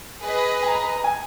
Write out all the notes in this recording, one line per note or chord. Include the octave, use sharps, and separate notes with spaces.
G#4 B4 D#5
G#5
A#5
B5
A#5
A#5
G#5